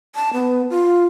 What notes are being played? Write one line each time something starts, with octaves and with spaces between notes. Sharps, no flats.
A5
B3
F4